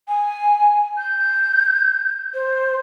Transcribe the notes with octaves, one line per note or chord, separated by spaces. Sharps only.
G#5
G6
C5